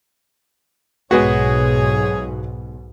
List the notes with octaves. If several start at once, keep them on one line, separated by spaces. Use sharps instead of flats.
B1 G#2 B2 G#3 B3 F#4 G#4 C#5